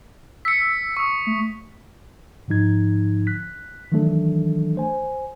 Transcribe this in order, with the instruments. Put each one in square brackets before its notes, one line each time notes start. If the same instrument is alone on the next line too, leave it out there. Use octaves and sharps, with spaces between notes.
[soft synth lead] E6 [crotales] B6 C#7
[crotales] C#6 D#6
[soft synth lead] A3
[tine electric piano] G#2 D3 F3 D#4 G#6
F#6 B6
D#3 E3 F#3 A3 D4 A4
C5 G#5